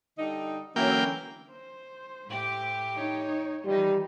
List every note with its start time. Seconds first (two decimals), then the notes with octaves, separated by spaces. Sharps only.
0.19 D3 G3 D#4
0.76 D3 E3 F#3 A#3 C#4 E4 G5
1.51 C5
2.27 A2 G4
2.95 D#4 C#5
3.65 D#3 E3 G3 D#4 F4